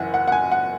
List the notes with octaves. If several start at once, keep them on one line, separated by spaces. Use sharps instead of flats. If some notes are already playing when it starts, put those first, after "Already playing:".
Already playing: F#1 F#2 E3 F#5 G#5
F#5
F#5
G#5
F#5